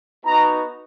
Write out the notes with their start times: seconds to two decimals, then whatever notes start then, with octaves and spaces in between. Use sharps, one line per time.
0.25 B3 D#4 F#4 A#5